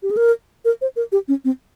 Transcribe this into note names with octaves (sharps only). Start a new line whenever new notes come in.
G4
G#4
A#4
A#4
C5
A#4
G4
C#4
C4